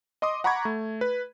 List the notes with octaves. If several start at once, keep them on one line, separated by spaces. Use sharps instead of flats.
D#5 C6 D6 D#6
F#5 A#5 B5 C#6 D6 G#6
A3
B4